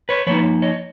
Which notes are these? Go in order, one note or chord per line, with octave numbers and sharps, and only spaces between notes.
B4 C#5
F3 A#3 D#4 B4 C#5
C#5 D#5